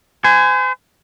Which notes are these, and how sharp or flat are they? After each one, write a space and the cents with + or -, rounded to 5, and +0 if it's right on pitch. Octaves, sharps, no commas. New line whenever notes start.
C5 -40 G#5 +0